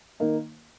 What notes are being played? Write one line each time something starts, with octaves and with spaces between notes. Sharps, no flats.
D#3 A#3 D#4